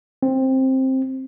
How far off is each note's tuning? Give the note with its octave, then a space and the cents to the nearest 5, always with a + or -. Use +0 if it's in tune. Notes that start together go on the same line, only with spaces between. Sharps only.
C4 +10